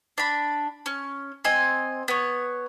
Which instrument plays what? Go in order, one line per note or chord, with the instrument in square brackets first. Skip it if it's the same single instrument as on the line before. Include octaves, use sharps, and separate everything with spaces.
[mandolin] D4 B5
C#4
C4 D#5 G#5
B3 C#5